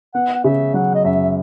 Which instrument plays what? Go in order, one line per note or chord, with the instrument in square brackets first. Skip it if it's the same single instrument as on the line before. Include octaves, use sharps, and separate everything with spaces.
[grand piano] B3 [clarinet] F#5
[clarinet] F#5
[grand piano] C#3 [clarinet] E5
[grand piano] F#3 [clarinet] F#5
[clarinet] D#5
[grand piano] F#2 [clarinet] E5